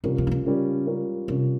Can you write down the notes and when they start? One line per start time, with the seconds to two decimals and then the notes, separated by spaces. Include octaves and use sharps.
0.04 C3 G3 C#4 F4 A#4
0.18 C3
0.27 D#3
0.31 C#3
0.46 G3 C#4 F4 A#4
0.87 G3 C#4 F4 A#4
1.28 C3 G3 C#4 F4 A#4